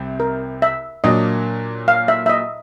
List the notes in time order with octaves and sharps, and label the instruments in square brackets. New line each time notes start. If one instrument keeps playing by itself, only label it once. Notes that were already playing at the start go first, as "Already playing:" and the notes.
Already playing: [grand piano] C2 C3 C4
[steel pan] A#4
E5
[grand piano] A#2 F#3 A#3 D4 [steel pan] D#5
[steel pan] F5
E5
E5
D#5